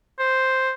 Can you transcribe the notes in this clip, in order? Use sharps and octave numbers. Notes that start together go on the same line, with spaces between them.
C5